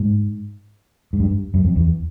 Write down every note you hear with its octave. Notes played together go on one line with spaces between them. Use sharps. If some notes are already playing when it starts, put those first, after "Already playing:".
Already playing: G#2
G#2
G2
F#2
F2
E2